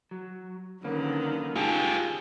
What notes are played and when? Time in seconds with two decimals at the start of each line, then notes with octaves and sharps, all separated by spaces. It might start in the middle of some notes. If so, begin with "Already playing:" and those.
0.11 F#3
0.84 D3 D#3 F#3 A#3 C#4 B4
1.56 D#4 F4 G4 G#4 G5 A5